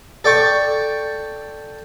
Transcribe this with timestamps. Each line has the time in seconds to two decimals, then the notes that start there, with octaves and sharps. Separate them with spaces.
0.24 A4 D5 G5 C#6